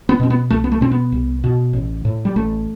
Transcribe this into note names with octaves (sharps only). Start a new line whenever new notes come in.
B3
B2 C4
B3
C2 A3
B3
A3
B2 C4
B3
C2
B2
A1
A2
G3
A1 A3